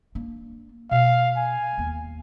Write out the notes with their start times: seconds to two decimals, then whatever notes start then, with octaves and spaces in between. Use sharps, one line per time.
0.15 A#3 D4
0.91 B2 F5
1.37 G#5
1.78 D#2 B3